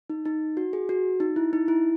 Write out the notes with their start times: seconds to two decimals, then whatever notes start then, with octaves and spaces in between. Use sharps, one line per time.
0.10 D#4
0.25 D#4
0.57 F#4
0.73 G#4
0.89 F#4
1.20 D#4
1.36 E4
1.53 D#4
1.68 E4